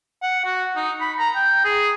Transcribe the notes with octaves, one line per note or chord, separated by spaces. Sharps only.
F#5
F#4
D#4
B5
A#5
G5
G#4